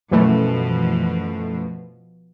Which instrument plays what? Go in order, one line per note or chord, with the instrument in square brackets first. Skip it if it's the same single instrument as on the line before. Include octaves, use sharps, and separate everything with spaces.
[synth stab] F#2 E3 A3 [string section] B2 F3